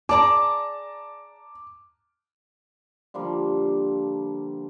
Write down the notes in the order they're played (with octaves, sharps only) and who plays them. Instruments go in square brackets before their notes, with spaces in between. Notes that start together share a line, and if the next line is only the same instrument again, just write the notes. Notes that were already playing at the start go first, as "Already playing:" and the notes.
[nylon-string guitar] G#4 D5 [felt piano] A5 A#5 [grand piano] D6
[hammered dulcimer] D3 F3 G3 A#3